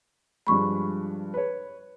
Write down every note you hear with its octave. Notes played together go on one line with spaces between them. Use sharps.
G2 F3 G#3 B5 C#6
B4 C#5